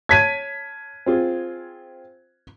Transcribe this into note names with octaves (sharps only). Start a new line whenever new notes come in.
C#5 A5 G#6 B6 D#7
C4 F4 G#4